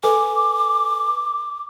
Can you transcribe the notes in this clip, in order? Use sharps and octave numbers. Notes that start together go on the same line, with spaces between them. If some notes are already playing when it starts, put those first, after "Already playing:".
A4 B4 G#5 D6